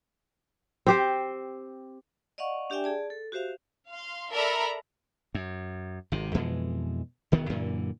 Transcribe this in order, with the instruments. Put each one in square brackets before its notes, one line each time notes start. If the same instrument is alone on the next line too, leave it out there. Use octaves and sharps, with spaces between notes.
[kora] C4 G4 C5
[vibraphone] D5 D#5 F5 F#5 C#6
D4 G4 D5 E5 G5 G#5
G#4 D5 A5
A4
F#4 G4 C5 E5 F5
[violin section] F5 C6
A4 A#4 D5 E5 A#5 B5
[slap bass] F#2
G#1 C3
F2 B2 E3 G#3
E1 D#3 E3 B3
F#2 A#2 D3 E3